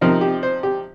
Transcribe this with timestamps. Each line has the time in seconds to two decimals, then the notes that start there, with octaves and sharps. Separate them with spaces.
0.01 C3 F3 C4 D#4 A#4
0.21 G4
0.43 C5
0.63 G4